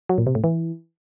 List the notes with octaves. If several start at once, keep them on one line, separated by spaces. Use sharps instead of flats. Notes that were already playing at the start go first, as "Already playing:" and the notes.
F#3
A#2
C3
A2
E3